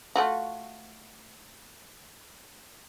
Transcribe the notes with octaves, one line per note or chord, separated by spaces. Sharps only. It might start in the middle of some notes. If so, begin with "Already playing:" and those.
A3 F4 F#4